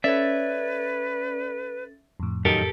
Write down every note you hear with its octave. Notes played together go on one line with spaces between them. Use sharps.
C#4 A4 B4 C#5 D5 E5 A6
F2 A2
F#2 D#3 D#4 G4 A4 A#4